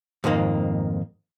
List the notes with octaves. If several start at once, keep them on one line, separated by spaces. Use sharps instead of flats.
F2 G#2 D#3 A#3